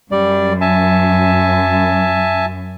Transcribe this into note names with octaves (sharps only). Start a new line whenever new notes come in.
F#2 G3 D5
E5 G#5 A5